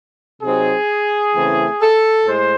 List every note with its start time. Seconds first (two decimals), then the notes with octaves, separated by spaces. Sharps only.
0.42 C3 F#3 C4 D#4 G#4
1.33 C#3 E3 A3 C4 E4
1.80 A4
2.26 A2 G#3 C5